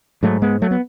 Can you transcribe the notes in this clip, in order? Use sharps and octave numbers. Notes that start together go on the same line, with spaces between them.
G#2 F#3 A3
G#3 B3
F#3 A3
B3